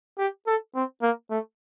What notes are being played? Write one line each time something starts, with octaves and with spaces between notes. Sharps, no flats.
G4
A4
C4
A#3
A3